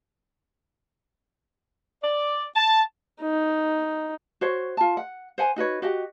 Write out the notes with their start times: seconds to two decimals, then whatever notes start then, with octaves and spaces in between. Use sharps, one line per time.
2.03 D5
2.56 A5
3.22 D#4
4.41 F#4 C5 C#5
4.77 F4 A5
4.97 F#5
5.38 C5 F#5 G#5
5.56 D#4 F#4 B4 C#5
5.82 F#4 G4 D#5 F#5